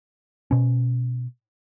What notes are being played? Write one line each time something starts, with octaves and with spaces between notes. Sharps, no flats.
B2 C#4